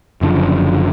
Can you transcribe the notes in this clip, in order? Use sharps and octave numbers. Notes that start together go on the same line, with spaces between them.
F#1 F#2 D3 F3